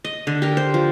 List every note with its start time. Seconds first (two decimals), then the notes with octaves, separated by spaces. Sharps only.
0.05 D#5
0.27 D3
0.42 G4 A#4
0.57 C5
0.74 F3